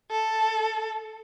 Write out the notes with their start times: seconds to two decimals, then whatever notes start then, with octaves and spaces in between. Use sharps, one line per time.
0.11 A4